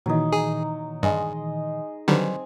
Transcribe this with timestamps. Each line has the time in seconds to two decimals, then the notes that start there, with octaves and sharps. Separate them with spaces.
0.06 A#2 D#3 E3 F#3 D#4
0.32 G#4
1.03 G2 G#3 D#5
2.08 D3 D#3 F#3 G3 C4 B4 G#5